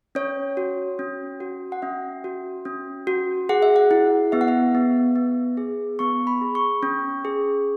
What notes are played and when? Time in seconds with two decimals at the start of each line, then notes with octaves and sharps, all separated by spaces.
0.15 C#4 C#5
0.57 F#4
0.99 C#4
1.40 F#4
1.72 F#5
1.82 C#4 E5
2.24 F#4
2.65 C#4
3.07 F#4
3.49 G#4 F#5
3.62 E5
3.76 F#5
3.91 E4
4.32 B3 E5
4.41 F#5
4.48 E5
4.75 B3
5.16 B3
5.57 G#4
5.99 B3 C#6
6.27 B5
6.41 G#4
6.55 C#6
6.83 C#4
7.25 G#4